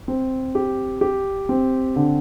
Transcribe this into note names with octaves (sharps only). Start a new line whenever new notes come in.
C4
G4
G4
C4
D3